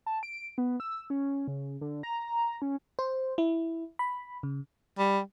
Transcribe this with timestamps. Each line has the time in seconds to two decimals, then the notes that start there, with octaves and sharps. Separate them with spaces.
0.06 A5
0.23 D7
0.58 B3
0.80 E6
1.10 C#4
1.48 C#3
1.81 D3
2.03 A#5
2.62 C#4
2.99 C5
3.38 E4
3.99 B5
4.43 C#3
4.98 G3